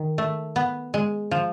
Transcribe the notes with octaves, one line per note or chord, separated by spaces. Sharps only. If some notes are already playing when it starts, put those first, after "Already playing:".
Already playing: D#3
A3
B3
G#3
F3